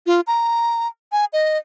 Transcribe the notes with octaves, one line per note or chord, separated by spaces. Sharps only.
F4
A#5
G#5
D#5